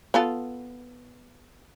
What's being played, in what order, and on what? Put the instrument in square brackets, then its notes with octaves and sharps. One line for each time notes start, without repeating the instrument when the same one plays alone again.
[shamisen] B3 F4 A4